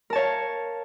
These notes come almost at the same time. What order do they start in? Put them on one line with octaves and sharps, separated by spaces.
A#4 A5 C#5 F5